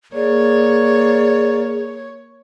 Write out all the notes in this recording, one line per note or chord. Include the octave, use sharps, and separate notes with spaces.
A#3 G#4 C#5 D5